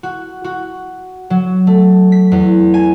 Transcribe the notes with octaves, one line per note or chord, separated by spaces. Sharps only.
F#4
F#4
F#3
A3
B6
E2
G#5